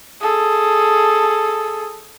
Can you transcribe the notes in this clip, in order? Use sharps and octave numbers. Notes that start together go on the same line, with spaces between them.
G#4 A4